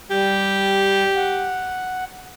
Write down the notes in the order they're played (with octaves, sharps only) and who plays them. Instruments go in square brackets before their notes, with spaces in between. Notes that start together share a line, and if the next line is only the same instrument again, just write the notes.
[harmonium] G3 [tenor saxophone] G4
[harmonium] F#5